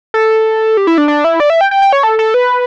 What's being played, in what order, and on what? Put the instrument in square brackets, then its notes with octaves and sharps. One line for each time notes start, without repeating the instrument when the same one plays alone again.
[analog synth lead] A4
G4
E4
D4
D4
E4
D5
E5
G5
G5
G5
C#5
A4
A4
B4